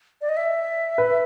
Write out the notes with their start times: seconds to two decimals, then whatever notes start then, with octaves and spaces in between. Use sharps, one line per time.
0.21 D5
0.29 D#5
0.37 E5
0.98 B4